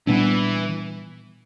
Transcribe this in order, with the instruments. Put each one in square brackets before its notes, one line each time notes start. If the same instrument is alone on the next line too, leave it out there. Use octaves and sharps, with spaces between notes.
[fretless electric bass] A#2 G3 B3 D4 [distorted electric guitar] E3